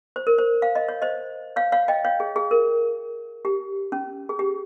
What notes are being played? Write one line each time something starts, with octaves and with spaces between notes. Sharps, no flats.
C5
A#4
C5
F5
D#5
C#5
C5 D#5
C#5 F5
C#5 F5
D#5 G5
C#5 F5
G#4
G#4
A#4
G4
C#4
G#4
G4